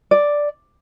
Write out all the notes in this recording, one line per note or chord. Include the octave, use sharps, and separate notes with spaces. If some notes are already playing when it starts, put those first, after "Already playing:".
D5